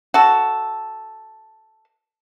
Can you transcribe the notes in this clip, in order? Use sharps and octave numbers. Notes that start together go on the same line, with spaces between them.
F#4 A4